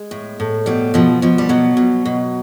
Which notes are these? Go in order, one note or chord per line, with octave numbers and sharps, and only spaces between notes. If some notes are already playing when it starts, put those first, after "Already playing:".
Already playing: G#3
A2
A2
B2 G3
B2 F3
B2 F3
G3
B2 F#3
B2
B2